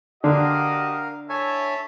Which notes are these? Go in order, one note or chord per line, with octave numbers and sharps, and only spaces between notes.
D3 D4 F#4 G4 A#4 D#5 F5
E4 A4 C#5 E5 G#5